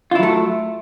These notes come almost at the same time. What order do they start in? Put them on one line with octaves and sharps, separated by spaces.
F4 E4 F#3 A3